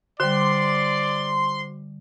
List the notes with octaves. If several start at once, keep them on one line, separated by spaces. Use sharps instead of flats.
D3 G3 F#4 C5 D5 C6 D6